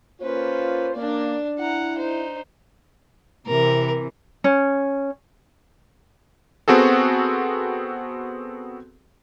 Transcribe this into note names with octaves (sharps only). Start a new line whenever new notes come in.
A#3 C#4 F4 B4 C5
A#3 D4 D5
E4 F#5 A#5
D#4 C5
C3 E3 A#4
C#4
B3 C4 F#4 G#4 A4